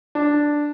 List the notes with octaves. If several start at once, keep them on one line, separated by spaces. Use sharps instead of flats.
D4